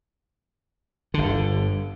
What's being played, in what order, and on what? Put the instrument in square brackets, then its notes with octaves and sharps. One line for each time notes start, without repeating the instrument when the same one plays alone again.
[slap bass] G1 D3